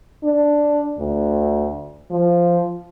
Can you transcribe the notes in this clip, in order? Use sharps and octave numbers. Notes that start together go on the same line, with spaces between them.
D4
D2
F3